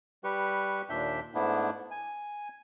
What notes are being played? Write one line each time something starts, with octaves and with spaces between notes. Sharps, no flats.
G3 G4 B4 C#6
D#2 A#2 D4 E5 G6
G#2 A3 B3 D4 E4
G#5